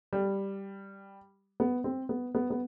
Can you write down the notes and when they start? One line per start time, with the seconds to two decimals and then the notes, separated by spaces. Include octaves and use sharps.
0.13 G3
1.60 B3
1.84 C4
2.09 B3
2.35 B3
2.50 B3